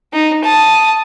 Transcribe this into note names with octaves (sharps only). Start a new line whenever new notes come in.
D#4
A5 D#6